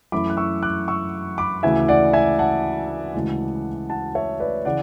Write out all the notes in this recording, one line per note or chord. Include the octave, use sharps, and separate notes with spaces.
F#2 E3 A3 C#4 E4 B5 D6
F#6
C#6 E6
D6 F#6
C#6 E6
B5 D6
D2 C#3 E3 E5 G#5
D5 F#5
E5 G#5
F#5 A5
D2 C#3 E3 G#3
F#5 A5
C#5 E5
B4 D5
C#3 E3 D5 F#5